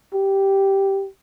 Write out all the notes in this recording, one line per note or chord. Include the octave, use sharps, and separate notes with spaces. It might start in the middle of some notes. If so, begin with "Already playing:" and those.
G4